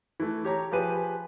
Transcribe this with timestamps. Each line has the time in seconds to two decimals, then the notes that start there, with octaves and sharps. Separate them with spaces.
0.20 E3 A3
0.45 G4 C#5 A#5
0.71 F3 G4 G#4 B4 D#7